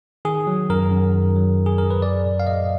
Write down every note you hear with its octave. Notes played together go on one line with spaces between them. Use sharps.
D#3 G#4
F#3
F#2 A#4
F#2
D#3
F#3
F#2
G#4
F#2 A#4
B4
F#3 D5
A#2
F5
A#2 D#5